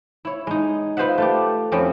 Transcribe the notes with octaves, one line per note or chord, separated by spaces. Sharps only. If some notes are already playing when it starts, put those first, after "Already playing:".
E4 C#5
G#3 D#4
F4 B4 C5 D#5 E5 F#5
A3 F4 G4
F2 C4 C#4 E4